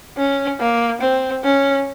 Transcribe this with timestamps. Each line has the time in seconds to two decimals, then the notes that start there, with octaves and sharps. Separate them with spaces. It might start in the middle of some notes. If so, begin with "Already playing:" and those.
0.17 C#4
0.60 A#3
1.01 C4
1.44 C#4